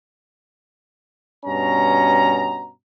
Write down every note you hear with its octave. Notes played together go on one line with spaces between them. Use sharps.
G2 B2 C#4 A#5